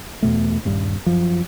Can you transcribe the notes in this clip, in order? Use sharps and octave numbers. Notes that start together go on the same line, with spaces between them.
E2 B2 A3
D#1 G2 G3
F#2 F3